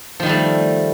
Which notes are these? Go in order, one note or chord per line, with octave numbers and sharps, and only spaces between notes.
D#3 F3 G3 A3